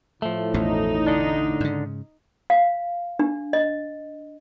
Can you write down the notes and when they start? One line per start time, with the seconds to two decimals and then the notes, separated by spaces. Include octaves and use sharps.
0.22 A2 F3 A3
0.54 A1 E2 B2 D#4
1.07 D3 D4
1.60 G#2 C#3
2.50 F5
3.19 D4
3.53 D#5